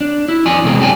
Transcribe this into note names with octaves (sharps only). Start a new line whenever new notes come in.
D4
E4
F2 D5 G#5
E2 C3 G#3 A#3 C4 G4
F#2 C#4 D4 G4 G5 G#5